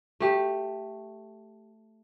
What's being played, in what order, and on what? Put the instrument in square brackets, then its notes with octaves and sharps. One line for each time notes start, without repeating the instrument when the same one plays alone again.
[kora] A3 G4